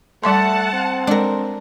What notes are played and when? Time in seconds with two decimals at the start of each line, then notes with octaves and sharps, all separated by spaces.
0.24 G3 A3 E5 F#5 A5 C6
0.73 C4
1.07 G#3 D4 A#4